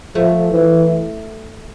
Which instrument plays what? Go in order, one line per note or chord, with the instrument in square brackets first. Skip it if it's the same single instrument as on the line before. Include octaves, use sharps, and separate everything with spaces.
[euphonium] F3 [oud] A3
[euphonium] E3